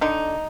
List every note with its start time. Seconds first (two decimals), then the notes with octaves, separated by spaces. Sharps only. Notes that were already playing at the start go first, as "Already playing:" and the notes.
0.01 D3 D#4